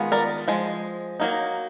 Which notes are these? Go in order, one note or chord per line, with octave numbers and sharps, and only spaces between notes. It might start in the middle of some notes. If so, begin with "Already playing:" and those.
Already playing: D#3 G#3 B3 F4
A#4 D5
F3 G#3
F#3 A#3 D#4